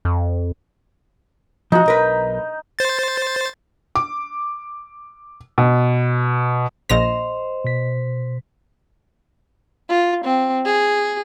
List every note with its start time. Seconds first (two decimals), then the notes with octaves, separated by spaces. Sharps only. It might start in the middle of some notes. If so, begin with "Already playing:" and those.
0.05 F2
1.72 F3 D#4 F#4
1.86 B1 A#4 B4
2.79 C5 A6
3.95 D6
5.58 B2
6.89 A#1 C5 D#5 A#6 F7
7.64 B2 B6
9.89 F4
10.25 C4
10.65 G#4